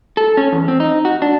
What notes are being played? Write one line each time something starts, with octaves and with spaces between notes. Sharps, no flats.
A4
C#4
E2
C4
D#4
F#4
D4